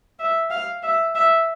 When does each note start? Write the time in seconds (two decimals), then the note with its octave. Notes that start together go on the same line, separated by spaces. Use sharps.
0.19 E5
0.50 F5
0.83 E5
1.15 E5